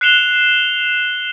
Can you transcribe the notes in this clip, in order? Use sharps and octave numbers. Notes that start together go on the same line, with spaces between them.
F#6 C7 C#7 E7 F7 G7